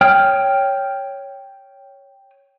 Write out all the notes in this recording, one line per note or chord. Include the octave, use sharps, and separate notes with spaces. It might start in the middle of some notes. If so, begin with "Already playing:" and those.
C#5 G5 D#6 F6